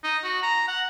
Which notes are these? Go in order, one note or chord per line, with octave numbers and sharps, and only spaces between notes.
D#4
F#4
A#5
F#5